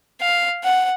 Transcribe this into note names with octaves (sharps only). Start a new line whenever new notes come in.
F5
F#5